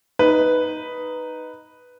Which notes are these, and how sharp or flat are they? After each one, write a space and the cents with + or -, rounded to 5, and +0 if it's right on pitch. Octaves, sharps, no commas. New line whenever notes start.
D#4 +0 B4 +0